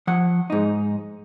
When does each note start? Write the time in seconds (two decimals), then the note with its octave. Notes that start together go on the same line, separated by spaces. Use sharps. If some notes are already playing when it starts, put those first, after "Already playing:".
0.07 F3 F#5
0.50 G#2 D#4